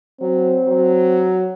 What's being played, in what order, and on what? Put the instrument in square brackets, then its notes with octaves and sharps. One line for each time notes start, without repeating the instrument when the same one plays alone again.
[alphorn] F#3 [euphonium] C4
[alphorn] F#3